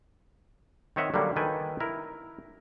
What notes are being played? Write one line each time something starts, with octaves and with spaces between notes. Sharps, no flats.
D#3 C4 C#5 D#5 E5 F#5
D3 F#3 G3 A#3
D#3 A4 B4 G5 G#5
E4 A#4